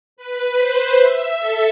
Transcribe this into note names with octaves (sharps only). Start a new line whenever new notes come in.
B4
C5
E5
A4